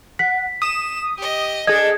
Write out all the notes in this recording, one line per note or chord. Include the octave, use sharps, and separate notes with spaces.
F#5 B6
D#6 E7
G4 D#5
D4 G#4 A4 D#5 G#6